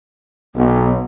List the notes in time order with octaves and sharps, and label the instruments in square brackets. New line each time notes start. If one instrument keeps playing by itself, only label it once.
[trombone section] B1 [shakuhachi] B3